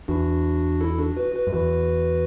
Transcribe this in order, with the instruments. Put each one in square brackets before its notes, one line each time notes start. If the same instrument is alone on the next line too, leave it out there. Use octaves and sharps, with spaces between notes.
[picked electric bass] E2 [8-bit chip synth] D4 F#4
[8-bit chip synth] E4 A4
D4 F#4
F#4 B4
F#4 B4
[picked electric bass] F#2
[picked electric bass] E2 [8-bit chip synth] F#4 B4